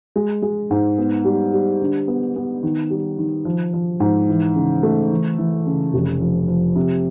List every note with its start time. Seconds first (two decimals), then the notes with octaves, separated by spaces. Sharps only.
0.16 G#3
0.42 G#3
0.71 G#2
0.98 B3
1.25 G3
1.53 G3
1.81 D3
2.08 B3
2.36 B3
2.63 D#3
2.90 G3
3.18 D#3
3.45 F3
3.74 F3
4.00 G#2
4.29 E3
4.56 C#3
4.83 A3
5.11 E3
5.38 E3
5.66 C#3
5.94 F1
6.21 F3
6.48 F3
6.76 C3